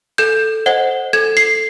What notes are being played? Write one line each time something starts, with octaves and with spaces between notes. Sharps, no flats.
A4 G6
C5 D#5 F#5
A4 G#6
C7